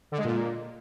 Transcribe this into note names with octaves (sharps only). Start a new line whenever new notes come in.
D3
G#3
A#2